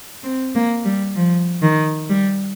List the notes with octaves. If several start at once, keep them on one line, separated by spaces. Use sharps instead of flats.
C4
A#3
G3
F3
D#3
G3